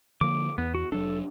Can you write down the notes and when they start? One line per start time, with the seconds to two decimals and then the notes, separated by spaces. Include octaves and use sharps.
0.21 D3 F3 A#3 D6
0.58 E2 B3
0.75 F#4
0.92 F1 F#3 D4 A4